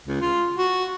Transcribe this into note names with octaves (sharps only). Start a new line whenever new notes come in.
C#2
F4
F#4